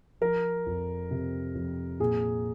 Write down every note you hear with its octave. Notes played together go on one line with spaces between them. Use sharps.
F3 A#4
F2
C3
F2
A#2 G#4